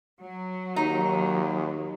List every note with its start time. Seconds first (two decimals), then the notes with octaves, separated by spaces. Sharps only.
0.20 F#3
0.76 D#2 D#4